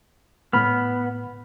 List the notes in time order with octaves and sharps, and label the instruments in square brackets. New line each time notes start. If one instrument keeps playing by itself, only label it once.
[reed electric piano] A2 B5 F6 [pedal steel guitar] B3